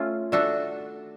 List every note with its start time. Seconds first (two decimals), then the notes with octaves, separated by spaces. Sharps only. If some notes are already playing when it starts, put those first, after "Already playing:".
Already playing: A3 C#4 F4
0.32 A3 D4 F#4 A4